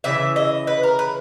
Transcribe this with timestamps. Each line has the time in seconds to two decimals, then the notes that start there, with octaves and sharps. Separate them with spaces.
0.04 C#3 E3 E5
0.36 D#5
0.67 B4
0.83 A#4
0.99 B4